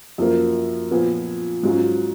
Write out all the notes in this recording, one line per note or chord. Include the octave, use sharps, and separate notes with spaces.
F#2 F3 A#3
A#2 F3 B3
G#2 F#3 C#4 F4